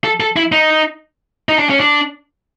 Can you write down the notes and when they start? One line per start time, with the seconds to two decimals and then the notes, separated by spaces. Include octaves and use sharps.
0.04 A4
0.20 A4
0.36 E4
0.52 D#4
1.49 D#4
1.59 D4
1.70 C#4
1.80 D4